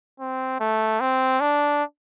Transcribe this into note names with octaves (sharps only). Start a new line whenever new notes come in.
C4
A3
C4
D4